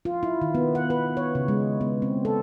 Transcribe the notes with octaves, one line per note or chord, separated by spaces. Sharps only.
F4
E4
D#3
B3
F#5
B4
C#5
C#3
G#3
B3
C4
A4